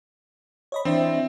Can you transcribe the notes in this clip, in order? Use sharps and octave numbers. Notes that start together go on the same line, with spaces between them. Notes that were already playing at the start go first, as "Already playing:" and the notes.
C#5 D#5 B5
E3 C4 D4 E5